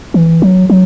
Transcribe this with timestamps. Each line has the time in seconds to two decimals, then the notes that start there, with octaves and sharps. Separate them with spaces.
0.14 E3
0.42 F#3
0.70 F#3